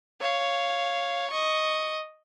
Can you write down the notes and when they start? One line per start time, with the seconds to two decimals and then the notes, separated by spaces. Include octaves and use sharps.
0.21 C#5 F5
1.31 D#5 C#6